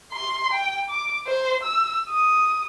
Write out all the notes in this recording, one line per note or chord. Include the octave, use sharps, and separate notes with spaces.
C6
G5
D6
C5
E6
D#6